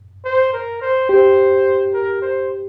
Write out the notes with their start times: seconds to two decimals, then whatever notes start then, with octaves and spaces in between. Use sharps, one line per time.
0.25 C5
0.53 A#4
0.81 C5
1.09 G4 C5
1.94 A#4
2.22 C5